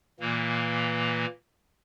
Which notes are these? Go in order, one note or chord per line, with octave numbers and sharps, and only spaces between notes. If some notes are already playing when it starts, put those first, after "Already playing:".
A#2 E3 A#3